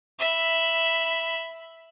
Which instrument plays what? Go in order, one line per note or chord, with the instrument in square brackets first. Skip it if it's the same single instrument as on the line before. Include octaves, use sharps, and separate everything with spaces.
[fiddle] E5 B5